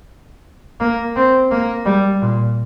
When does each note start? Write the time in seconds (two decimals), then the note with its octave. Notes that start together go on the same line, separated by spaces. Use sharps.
0.80 A#3
1.16 C4
1.51 A#3
1.85 G3
2.21 A#2